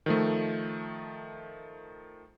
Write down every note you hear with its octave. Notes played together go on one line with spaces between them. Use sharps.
D#3 F3 A3